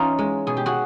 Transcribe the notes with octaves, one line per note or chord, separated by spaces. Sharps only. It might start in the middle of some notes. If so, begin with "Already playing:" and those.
Already playing: E3 C#4 D#4 F4
G#3
B2 G#4
G4
F#4 G#4